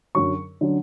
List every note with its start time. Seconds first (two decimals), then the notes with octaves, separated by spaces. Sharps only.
0.15 F#2 D3 F#3 C#4 C#6
0.61 D3 F#3 C#4